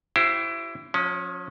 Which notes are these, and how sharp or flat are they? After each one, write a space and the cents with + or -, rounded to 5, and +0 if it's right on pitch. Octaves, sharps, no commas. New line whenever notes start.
E4 +20 G4 -35 C5 +0
F3 +45 C#4 +0